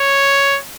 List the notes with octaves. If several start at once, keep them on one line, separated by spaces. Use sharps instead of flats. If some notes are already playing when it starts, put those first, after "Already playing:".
Already playing: C#5